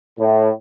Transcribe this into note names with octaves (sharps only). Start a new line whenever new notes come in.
A2